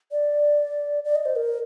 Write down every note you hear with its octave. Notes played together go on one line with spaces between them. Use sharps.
D5
D5
D#5
C5
A#4